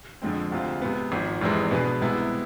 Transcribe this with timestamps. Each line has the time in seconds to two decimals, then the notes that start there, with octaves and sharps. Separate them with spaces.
0.22 F2 D3 F3 G#3 C4
0.52 D2 C3 G#3 C4 F4
0.81 C3 G#3 B3
1.12 G#1 G#2 F3
1.41 F1 E2 C3 E3 G#3
1.71 B2 B3 D4 G#4 B4
2.01 C2 C3 G#3 B3 E4